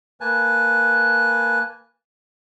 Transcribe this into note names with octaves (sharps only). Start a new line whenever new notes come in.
A#3 B4 G#5 A5